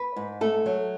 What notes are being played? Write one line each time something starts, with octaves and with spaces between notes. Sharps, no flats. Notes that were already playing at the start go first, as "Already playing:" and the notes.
Already playing: B4
G#2
A3 A4
F#3